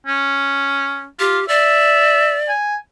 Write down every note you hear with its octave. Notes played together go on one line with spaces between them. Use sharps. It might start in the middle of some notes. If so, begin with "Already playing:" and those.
C#4
F4 G4
D5 E5
G#5